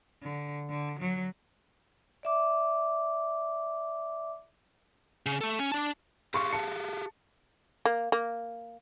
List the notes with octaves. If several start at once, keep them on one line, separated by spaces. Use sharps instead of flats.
D3
D3
F#3
D5 E5 D6
C#3
A3 A4
C#4
D4 A5
G4 G#4 F5 C6 C#6
A5 C#7
A#3
A#3